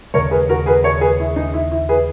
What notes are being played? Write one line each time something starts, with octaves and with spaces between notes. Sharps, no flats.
D#2 C#3 G#3 A#4 C#5
G#4 B4
F#4 A#4
G#4 B4
A#4 C#5
G#4 B4
E4
D#4
E4
E4
G#4 B4